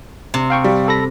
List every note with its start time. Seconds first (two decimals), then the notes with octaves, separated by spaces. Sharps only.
0.34 C3
0.50 F5 G5 C#6
0.64 G3
0.88 A4 B5 A#6